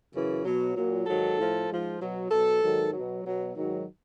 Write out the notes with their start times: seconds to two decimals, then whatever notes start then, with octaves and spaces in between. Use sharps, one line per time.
0.13 F#2 C#3 E3
0.44 B2 F#3
0.75 A#2 F#3
1.06 G#2 D#3 F#3 A4
1.37 A2 F3
1.68 G#2 F3
2.00 B2 F#3
2.31 B2 F#3 A4
2.62 G#2 D#3 F#3
2.93 B2 F#3
3.24 B2 F#3
3.55 G#2 D#3 F#3